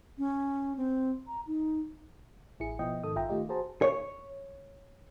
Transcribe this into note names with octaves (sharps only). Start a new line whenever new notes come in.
C#4
C4
A#5
D#4
A1 E4 G#4 C#7
B2 F3 B3 E4 D#5 G5
G#2 D#3 A4 D#6
A#1 F4 E5 G5 A#5
D#3 A3 F4 G4 D#5
F#4 G#4 C5 A5 A#5
C#5